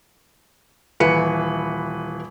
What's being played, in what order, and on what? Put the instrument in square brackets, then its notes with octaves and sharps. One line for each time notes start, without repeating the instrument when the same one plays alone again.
[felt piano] D#1 E3 B4 C#7